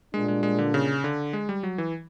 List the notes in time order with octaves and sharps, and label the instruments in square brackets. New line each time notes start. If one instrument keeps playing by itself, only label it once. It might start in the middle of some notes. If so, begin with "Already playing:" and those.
[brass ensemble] A#2 G3 A#3 D4 [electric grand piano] G#3
[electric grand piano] G#3
G#3
D3
C#3
D3
G#3
G3
F#3
E3